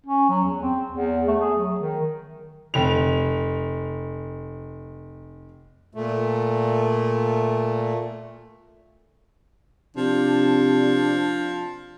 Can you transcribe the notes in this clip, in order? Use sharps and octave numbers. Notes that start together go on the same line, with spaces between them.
C#4
F#3
E2
C4
E2
A3
G#4
F#3
D#3
F1 F7
A#2 A3
C3 F3 D4